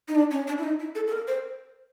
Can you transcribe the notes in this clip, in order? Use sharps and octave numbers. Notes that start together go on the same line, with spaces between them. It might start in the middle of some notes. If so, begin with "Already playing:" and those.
D#4
D4
C#4
D4
E4
D#4
E4
A4
A4
A#4
C5